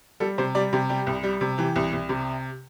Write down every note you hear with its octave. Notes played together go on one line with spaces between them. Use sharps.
G3 A4
C3 C5
G3 D5
C3 G4
G3 G4
C2
G3
C3
E3 G4
C2
C2
C3